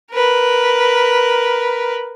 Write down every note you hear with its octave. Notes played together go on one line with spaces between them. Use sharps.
A#4 B4